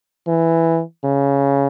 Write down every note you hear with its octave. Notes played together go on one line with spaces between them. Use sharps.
E3
C#3